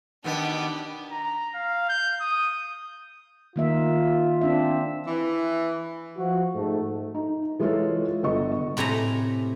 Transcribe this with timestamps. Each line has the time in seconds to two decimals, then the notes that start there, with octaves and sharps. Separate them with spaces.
0.24 B2 D#3 B3 D4 G4
1.11 A#5
1.55 F5
1.89 G6
2.20 D#6
3.56 D#3 A#3 F4 E5
4.41 C4 D4 E5
5.07 E3
6.17 F3 F#4
6.54 G#2 A3
7.15 D#4
7.59 E3 G#3 F4 G#4 A4 C#5
8.23 G1 B3 A4 D#5 C#6
8.77 A2 C3 A3 G#5 A#5